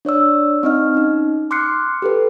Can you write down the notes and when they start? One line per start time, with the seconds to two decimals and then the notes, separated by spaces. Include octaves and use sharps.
0.05 D4 C#5 D5 E6
0.63 C4 D#4 D#5 F6
0.95 C#4 D#4
1.51 C6 D6 F6 F#6 C7 C#7
2.02 G4 A4 B4